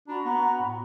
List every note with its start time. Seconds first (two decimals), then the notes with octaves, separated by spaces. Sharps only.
0.08 D4 F#4 A#5 B5
0.25 B3
0.60 A2